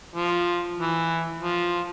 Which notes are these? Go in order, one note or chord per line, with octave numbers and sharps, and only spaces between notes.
F3
E3
F3